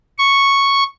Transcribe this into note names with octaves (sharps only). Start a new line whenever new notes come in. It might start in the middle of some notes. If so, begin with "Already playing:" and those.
C#6